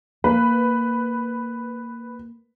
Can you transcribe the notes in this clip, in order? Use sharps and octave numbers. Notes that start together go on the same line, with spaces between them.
A#3 B4